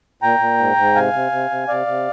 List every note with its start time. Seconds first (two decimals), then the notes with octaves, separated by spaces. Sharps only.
0.22 A#2 G5 A#5
0.40 A#2
0.58 G#2
0.77 G#2
0.95 C3 F5 G#5
1.13 C3
1.32 C3
1.51 C3
1.68 C3 D5 F5
1.87 C3